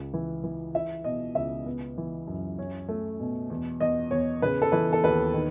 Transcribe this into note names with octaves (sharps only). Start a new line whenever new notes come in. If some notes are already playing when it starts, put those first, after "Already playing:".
Already playing: C#2
E3
E3
E4 E5
B2 D#5
C#2 E5
B3
E3
F#2
C#4
A3
B2
E2
E2 D#5
E2 C#5
C#3 B4
A4
E3 B4
A4
D#2 B4
D#3